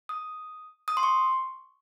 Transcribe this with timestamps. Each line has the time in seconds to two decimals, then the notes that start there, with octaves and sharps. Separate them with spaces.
0.09 D#6
0.88 D#6
0.97 C6
1.03 C#6